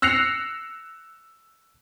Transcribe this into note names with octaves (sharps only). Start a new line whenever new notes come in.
E6 F#6 A#6 C7 C#7 F7